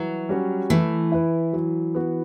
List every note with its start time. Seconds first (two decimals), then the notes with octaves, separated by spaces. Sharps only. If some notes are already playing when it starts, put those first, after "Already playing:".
Already playing: E3 F#3
0.29 G3 C#4 F#4
0.70 E3 A3
1.12 E4 B4
1.53 F#3
1.95 B3 F#4